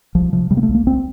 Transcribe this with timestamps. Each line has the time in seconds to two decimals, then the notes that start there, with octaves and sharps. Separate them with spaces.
0.15 C2 F3
0.33 C3 F3
0.51 C3 G3
0.57 A#3
0.63 A3
0.68 C2
0.74 A#3
0.86 C2 C4